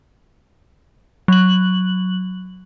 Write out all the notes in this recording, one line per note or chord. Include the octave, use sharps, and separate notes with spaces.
F#3 F#7